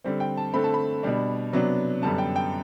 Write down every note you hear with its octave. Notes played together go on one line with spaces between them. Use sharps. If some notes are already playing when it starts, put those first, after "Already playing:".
D3 G3 C4
G5
A5
D3 A3 C4 B5
A5
B5
B2 G3 D4
C3 F#3 B3 D4
F#2 D3 G3 B3 A5
G5
G5